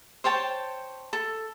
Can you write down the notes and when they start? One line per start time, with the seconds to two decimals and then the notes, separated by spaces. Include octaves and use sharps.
0.24 C5 C#5 G5 A5
1.13 A4